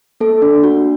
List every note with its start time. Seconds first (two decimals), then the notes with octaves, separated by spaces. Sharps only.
0.20 A#3 A4
0.42 D4
0.64 F#4